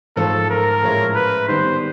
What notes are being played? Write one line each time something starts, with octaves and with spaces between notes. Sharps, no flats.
G#2 F3 A3 A4
A#4
A2 F3 G#3 C#4 E4
B4
D#3 G3 B3 C5